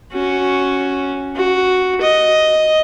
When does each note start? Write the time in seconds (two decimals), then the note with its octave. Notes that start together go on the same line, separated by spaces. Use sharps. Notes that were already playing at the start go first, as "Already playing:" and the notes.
0.13 C#4 F#4
1.36 F#4
2.01 D#5